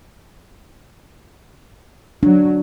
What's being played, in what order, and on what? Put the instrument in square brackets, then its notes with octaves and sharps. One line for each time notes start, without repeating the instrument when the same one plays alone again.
[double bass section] F#3 [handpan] D4